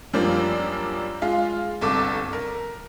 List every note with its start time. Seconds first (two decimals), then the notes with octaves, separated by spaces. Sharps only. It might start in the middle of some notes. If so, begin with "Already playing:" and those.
0.13 F#2 F3 G3 A#3 D4
1.22 G#3 F4 F5
1.81 G1 C2 A4 D6
2.33 A#4